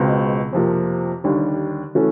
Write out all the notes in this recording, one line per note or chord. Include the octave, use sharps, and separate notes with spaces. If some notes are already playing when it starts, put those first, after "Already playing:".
Already playing: C#2 B2 G#3 C4
F2 C3 F3 A#3
D#2 D3 G3
E3 A3 C#4 F#4 A4